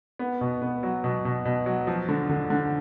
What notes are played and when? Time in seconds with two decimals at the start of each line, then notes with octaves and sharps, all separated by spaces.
0.19 B3
0.41 B2
0.62 B3
0.83 F#3
1.04 B2
1.25 B2
1.45 B2
1.66 F#3
1.87 F3
2.08 D3
2.29 D3
2.50 D3